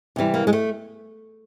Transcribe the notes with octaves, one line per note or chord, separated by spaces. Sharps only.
C3 E3 G3
A#3
G#3
A3